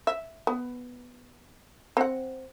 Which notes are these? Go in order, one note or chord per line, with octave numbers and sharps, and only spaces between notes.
E5
B3
C4 F#5